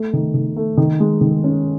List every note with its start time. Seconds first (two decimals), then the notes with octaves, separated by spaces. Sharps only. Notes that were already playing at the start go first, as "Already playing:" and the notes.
Already playing: A3
0.13 D#3
0.34 D#3
0.56 A3
0.77 D#3
1.00 G#3
1.21 D#3
1.44 C#4